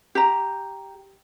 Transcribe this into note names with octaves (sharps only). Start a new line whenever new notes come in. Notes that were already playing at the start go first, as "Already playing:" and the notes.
G4 A#5